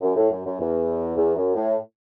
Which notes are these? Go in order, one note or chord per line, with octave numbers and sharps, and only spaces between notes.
F#2
A2
F#2
F#2
E2
E2
F#2
A2